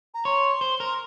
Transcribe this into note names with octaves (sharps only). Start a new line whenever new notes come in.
A#5
C#5 C6
C5
A#4